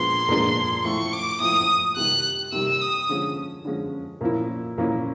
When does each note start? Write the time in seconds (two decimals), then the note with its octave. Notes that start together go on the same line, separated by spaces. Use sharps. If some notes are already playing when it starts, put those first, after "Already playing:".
Already playing: A#2 F3 G#3 B3 D4 C6
0.28 A#2 F3 G#3 B3 D4
0.85 A2 F3 A3 C#6
1.13 D6
1.40 A2 F3 A3 D#6
1.97 C3 D#3 G3 F#6
2.52 C3 D#3 G3 E6
2.81 D#6
3.09 D3 F3 G#3 C#4
3.65 D3 F3 G#3 C#4
4.21 A#2 F3 A#3 C#4 E4
4.78 A#2 F3 A#3 C#4 E4